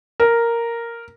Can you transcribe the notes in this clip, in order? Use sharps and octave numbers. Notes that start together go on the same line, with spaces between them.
A#4